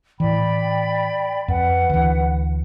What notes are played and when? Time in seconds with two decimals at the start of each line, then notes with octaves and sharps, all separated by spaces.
0.20 A2 E3 D5 G5 B5
1.48 F2 B4 F#5
1.90 D2 E3